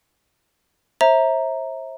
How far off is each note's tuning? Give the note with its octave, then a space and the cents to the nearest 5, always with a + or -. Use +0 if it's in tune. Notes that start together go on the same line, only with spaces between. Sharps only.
C5 +35 E5 -15 A#5 +0